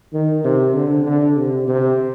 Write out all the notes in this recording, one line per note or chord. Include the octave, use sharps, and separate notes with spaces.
D#3
C3
D3
D3
C3
C3